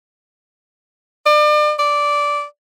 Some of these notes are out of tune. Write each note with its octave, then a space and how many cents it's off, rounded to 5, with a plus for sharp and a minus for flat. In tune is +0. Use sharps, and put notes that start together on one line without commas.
D5 +35
D5 -10